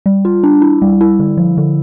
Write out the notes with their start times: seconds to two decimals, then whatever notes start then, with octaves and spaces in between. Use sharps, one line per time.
0.06 G3
0.25 F4
0.44 D4
0.62 E4
0.82 G3
1.01 E4
1.20 D3
1.37 F3
1.58 D3